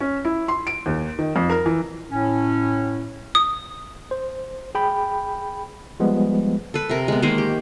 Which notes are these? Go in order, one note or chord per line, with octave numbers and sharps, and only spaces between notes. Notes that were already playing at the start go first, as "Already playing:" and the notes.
C#4
E4
C6
D7
D#2
D#3
F2
A#4
E3
A2 C#4
D#6
C5
G#4 G5 B5
F3 G3 G#3 B3
A4 B4
C3 A#4
G#3 B3
D#3 G#3 A#3 C5
G4